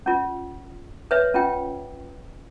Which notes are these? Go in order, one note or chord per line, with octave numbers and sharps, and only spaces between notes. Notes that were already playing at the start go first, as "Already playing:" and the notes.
C#4 F4
B4 C#5 E5
C#4 F4 G5